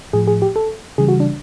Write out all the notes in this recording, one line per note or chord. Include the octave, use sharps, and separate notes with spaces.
A2 F3 G#4
G#4
G4
A4
C#3 E3 G3 G#4
F#4
D4